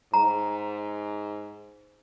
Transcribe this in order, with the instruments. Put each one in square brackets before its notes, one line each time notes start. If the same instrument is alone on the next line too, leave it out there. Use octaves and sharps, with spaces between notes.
[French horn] G#2 [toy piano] A#5